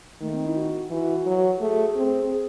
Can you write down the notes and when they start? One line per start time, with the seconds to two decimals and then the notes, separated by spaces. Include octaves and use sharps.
0.21 D#3 A3
0.33 C4
0.45 E4
0.57 F#4
0.91 E3 F#4
1.26 F#3
1.60 A3 G#4
1.96 C4
2.30 G#4